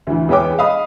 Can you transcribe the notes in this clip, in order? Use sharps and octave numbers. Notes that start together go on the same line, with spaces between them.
D2 E3
E2 G#3 B4 C#5 G5 D6
D#5 F5 B5 D#6